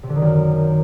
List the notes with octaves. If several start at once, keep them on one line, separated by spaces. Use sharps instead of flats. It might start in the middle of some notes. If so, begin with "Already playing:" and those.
C3
D3
D#3
F#2